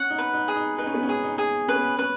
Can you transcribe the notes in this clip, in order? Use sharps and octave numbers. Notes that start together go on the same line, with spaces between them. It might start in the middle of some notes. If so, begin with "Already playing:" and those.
Already playing: C#4 F#5
D#4
B4
D#4
G#4
D#4
D#4 B4
C#4
B3
C#4
G#4
D#4
G#4
C#4 B4
B3
C#4
C#4 B4